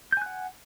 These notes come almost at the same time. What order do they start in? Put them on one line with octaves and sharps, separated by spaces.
G6 G#5 F#6 F#5